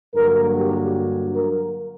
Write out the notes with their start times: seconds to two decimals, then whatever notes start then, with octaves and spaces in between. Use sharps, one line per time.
0.14 G2 D3 F#3 A#3 A#4
0.54 G4
1.34 A#4